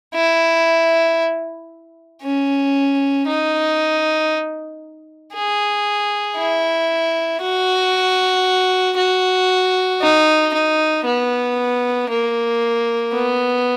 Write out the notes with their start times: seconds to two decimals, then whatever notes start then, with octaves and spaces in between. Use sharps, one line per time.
0.14 E4
2.22 C#4
3.27 D#4
5.34 G#4
6.38 E4
7.42 F#4
8.97 F#4
10.01 D#4
10.53 D#4
11.06 B3
12.10 A#3
13.14 B3